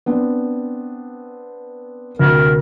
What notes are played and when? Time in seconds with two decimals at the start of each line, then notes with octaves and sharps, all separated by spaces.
0.06 B3 C4 D4
2.19 D2 C3 A#4